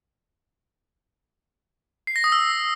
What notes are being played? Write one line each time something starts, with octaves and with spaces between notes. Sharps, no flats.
C7
A#6
D#6
E6